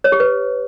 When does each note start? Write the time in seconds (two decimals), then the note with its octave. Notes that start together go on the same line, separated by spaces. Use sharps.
0.04 C#5
0.12 G4
0.20 B4